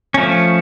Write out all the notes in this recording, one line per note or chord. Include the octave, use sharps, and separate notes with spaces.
F3 A3 C#4